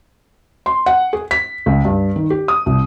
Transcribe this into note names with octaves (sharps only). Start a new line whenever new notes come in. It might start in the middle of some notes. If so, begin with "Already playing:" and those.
C6
F#5
G#4
B6
C#2
G2
D#3
G4
D#6
C2